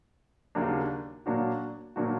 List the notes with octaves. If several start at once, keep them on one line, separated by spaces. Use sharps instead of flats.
D#2 C#3 F#3 A#3 D4
A#2 F#3 A#3 D4 F#4
A#2 F#3 A#3 D4 F#4